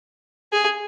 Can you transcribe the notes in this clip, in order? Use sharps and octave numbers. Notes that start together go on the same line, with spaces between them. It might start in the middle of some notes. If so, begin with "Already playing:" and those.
G#4